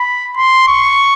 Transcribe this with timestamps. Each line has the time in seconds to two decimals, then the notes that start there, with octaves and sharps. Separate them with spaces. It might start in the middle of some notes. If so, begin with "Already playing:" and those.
Already playing: B5
0.37 C6
0.68 C#6